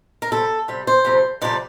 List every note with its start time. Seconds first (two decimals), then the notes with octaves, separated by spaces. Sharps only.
0.22 A#4
0.31 C3 G3 A4
0.68 C3 G3
0.87 C5
1.05 F2 C3 G3
1.42 F2 C3 G3 D5